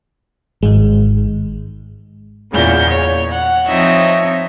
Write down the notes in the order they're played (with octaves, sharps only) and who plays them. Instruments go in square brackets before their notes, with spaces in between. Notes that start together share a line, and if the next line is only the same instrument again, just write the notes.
[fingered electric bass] G#1 [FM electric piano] G#2 G#3
[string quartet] E2 A#2 C#3 G6
C#5
F#5
F3 C4 D#4 C#5 D#5 E5